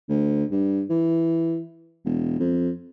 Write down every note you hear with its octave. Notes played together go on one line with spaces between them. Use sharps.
D2
G2
E3
E1
F2